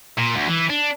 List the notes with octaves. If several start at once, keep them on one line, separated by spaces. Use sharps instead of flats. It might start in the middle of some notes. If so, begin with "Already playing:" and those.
A#2
D2
E3
D4